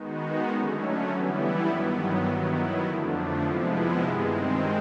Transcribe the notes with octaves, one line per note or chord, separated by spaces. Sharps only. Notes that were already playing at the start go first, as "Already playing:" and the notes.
Already playing: D#3 G#3 B3 D#4 F#4
D3 F#3 A3 C#4
E3 G3 B3 E4
G2 D#3 F#3 B3
D#3 F#3 B3 E4
F2 D3 F3 A3 D4
C3 F3 G#3 B3 E4
G2 D#3 G#3 C4